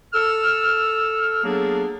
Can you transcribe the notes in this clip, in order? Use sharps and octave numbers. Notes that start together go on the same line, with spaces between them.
A4 E6 F6
F#3 A#3 B3 D4 G#4 A4